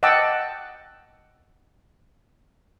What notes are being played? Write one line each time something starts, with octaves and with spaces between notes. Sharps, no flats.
D#5 F#5 G5 A5 D6 E6